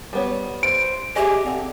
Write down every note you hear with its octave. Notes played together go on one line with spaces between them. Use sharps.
G3 B3 C#5
C5 D7
G4 G#4 D#5 E5
D3 C4